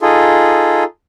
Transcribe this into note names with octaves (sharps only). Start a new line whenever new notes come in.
D#4 F4 G#4 A4